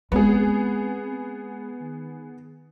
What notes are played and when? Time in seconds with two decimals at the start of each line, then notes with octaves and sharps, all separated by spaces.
0.12 G#3 B3 C4 G#4
1.81 D#3